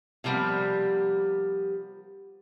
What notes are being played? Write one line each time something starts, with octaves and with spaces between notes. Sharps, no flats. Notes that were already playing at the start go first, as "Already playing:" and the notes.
C3 F3 G3 A#3 B3